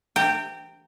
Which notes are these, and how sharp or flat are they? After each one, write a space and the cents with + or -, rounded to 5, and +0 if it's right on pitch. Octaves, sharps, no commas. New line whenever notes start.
G5 +0 A#5 -35